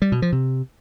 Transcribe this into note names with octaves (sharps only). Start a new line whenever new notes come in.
G3
B2
F3
C3